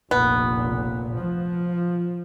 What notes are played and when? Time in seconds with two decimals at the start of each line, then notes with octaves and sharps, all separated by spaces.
0.11 F1 A#1 A#2 B3
1.18 F3